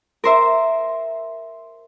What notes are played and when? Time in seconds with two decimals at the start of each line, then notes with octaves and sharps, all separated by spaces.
0.24 A#4 C5 E5